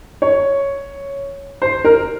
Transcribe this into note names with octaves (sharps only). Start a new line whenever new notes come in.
C#5
C5
A#4